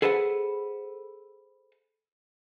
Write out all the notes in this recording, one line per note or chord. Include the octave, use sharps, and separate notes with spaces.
G#4 A4 B4 C5 F#5